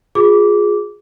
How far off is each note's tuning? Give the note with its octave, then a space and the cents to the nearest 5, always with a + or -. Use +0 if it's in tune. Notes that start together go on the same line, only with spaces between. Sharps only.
F4 +35 G#4 +0 D6 -15